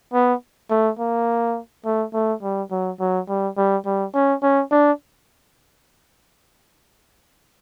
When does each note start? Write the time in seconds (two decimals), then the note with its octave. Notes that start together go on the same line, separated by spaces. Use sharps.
0.14 B3
0.71 A3
1.00 A#3
1.86 A3
2.14 A3
2.43 G3
2.71 F#3
3.00 F#3
3.29 G3
3.57 G3
3.86 G3
4.15 C#4
4.43 C#4
4.72 D4